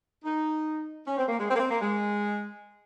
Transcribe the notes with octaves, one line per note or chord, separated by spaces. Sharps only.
D#4
C#4
C4
A#3
G#3
C4
A#3
C4
A#3
G#3